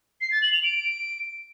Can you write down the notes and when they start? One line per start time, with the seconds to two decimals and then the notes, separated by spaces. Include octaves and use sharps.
0.21 C7
0.32 A6
0.42 F#7
0.53 F7
0.64 D7